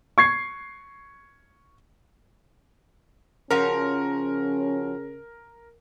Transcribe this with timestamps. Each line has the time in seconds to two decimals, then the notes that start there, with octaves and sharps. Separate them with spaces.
0.18 C#6 G#6 C7
3.51 C#3 F3 C#4 F#4 A#4 A#5